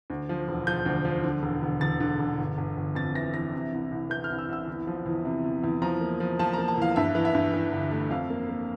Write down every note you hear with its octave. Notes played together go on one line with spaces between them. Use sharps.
D2
F3
E1
F3 G6
D2
F3
D3
E1
E1
E1 A6
D3
E1
G1
G1
G1
F2 A6
E3 A#6
E3 A#6
C3
C2
C2
E3 G6
F6
C2
E6
C2 E6
E2
F3
E2
C3
E2
E2
F3 A#5
A#3
F3
F3 A5
A#3 A#5
A5
E2 F5
G2 E5
E3
E5
G2
E3
G1
A3
F2 F5
A#3
A#3